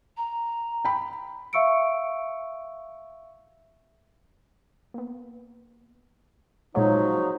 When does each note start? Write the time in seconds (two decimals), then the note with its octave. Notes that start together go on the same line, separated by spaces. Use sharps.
0.17 A#5
0.85 G5 B5
1.53 E5 F5 C#6 E6 C#7 D7
4.94 A#3 B3
6.75 A#2 C#3 F3 F#3 G#3 D#4 C#5